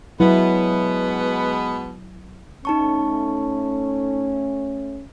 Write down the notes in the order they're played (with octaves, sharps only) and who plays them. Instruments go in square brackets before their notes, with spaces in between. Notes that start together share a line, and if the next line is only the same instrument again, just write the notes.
[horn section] B2 G#3 B3 [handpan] F#3 E4
[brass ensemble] A3 C#4 [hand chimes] D#4 A5 C#6